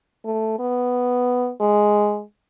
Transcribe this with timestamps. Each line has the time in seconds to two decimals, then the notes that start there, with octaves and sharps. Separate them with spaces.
0.25 A3
0.59 B3
1.61 G#3